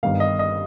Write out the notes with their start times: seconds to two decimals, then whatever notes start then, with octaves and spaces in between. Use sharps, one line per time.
0.03 G1 G2 D#3 F5
0.20 D#5
0.39 D#5